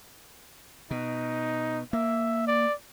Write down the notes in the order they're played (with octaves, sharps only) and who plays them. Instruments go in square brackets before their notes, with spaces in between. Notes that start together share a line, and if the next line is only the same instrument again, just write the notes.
[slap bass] B2 [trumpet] D#4
[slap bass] A#3 [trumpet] E5
[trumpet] D5